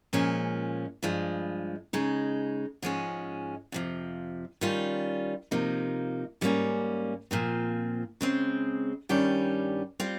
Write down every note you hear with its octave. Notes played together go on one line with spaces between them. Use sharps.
A#2 F3 G#3 C#4
G2 F3 G#3
C#3 G#3 D#4
G#2 F3 G#3 C#4
F2 C3 F3
D#3 G3 C#4 F4
C3 F3 A#3 D#4
G#2 G3 A#3 C#4
A#2 F3 C4
C#3 G#3 C4
G2 D#3 G3 C#4 G4
G3 C4 F4